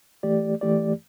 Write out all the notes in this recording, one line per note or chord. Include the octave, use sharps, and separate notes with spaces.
E3 A3 G4 D5
E3 A3 G4 D5